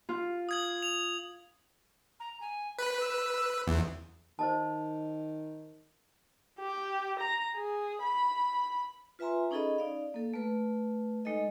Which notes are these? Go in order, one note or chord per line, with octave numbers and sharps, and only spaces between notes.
F4
D#6 G#6 F#7
G#6 F7
A#5
G#5
B4 B5
E6
E2
D#3 C5 D#5 A5
G4
A#5
G#4
B5
F4 B4 E5 G#5 A#5 C6
C#4 D#4 G#4 A4 D#5 B5
D#4 D5 F5
A#3 A4
A3 B4
G#3 D#4 A4 D#5